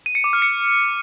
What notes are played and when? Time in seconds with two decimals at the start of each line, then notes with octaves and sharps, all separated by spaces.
0.06 D#7
0.15 C#7
0.24 D6
0.33 F6
0.42 C#7